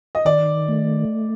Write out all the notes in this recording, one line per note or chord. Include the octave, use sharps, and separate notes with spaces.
D#5
D#3 D5
A3